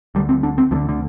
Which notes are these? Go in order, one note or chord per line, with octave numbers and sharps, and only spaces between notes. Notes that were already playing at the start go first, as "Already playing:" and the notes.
D2 D3 G3
C4
D4
C4
D2 D3 F3
D3